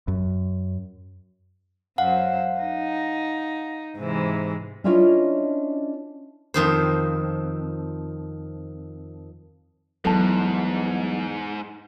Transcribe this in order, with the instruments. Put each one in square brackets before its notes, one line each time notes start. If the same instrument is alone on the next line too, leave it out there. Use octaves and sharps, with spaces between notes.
[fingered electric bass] F#2
[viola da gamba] F#2 C5 [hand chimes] F5 F#5
[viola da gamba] D#4
G#2 C3 E3
[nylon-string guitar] C#4 D4 E4 F4 C#5 D#5
[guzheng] F2 D#3 C5
[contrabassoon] E2 [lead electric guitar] G#2 [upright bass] F#3 G3 [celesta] A4 A5